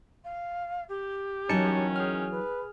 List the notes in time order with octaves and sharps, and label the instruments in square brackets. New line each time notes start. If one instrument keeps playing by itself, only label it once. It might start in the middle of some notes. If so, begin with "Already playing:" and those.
[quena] F5
G4
[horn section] D#3 C#4 [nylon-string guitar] E3 F#3 [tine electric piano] D#4 A5 C#7
[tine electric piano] G#4 F6 [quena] G5
[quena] B4